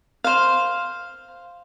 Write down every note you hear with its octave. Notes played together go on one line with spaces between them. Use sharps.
C5 F5